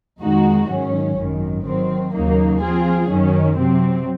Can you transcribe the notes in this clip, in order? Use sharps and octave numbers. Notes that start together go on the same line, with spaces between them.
F2 D#3 G#3 D#4 F#4
G#2 D#3 F#3 C#4
G#1 F#2 D#3
D#3 F#3 C4
D#2 C#3 F#3 A#3 D#4
F3 C4 F4 G#4
F#2 D#3 F#3 C#4
C3 F#3 C4